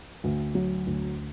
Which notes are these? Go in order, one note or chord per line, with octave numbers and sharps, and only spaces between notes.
D2
F#3
D2